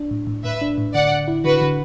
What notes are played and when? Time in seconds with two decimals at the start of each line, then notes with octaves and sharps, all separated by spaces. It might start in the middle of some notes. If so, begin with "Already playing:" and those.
Already playing: D4
0.11 A2
0.27 A2
0.44 A2 B4 E5
0.61 D4
0.78 A2
0.94 D3 D5 F#5
1.12 D3
1.28 E4
1.44 D3 F#4 B4
1.61 D3